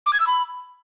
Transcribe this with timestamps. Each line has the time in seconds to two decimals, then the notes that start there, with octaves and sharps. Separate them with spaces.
0.06 D6
0.13 G#6
0.20 E6
0.27 B5